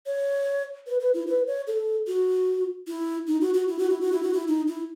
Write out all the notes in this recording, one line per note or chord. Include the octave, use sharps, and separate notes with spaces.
C#5
B4
B4
E4
B4
C#5
A4
F#4
E4
D#4
F#4
F#4
E4
F#4
E4
F#4
E4
F#4
E4
D#4
E4